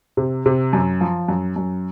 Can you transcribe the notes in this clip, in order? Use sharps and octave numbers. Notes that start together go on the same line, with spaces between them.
C3
C3
F#2
F3
F#2
F#2